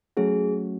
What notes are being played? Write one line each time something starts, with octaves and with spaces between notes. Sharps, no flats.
F#3 A3 C#4 F#4 G#4